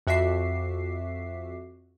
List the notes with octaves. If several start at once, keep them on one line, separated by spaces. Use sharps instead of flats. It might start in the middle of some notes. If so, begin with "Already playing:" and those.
F2 F#4 E5 D6 B6 C7